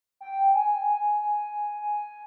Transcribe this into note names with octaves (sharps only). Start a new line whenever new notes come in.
G5
G#5